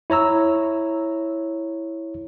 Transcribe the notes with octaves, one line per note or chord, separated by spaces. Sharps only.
E4 C#5 A#5 E6